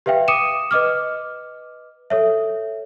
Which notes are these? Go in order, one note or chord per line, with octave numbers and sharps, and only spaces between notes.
G4 B4 E5 F5 G5
D6 D#6 C#7 D#7 E7
B4 D#5 D6 F6
A4 C#5 E5